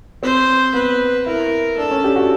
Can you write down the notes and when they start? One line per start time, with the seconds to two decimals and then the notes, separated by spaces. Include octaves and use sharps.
0.23 C4 C5
0.74 B3 B4
1.26 E4 A#4
1.78 D4 A4
1.91 C#4
2.04 G4
2.16 F#4